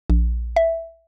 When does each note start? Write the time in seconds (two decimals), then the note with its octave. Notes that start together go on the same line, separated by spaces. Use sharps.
0.10 A#1
0.56 E5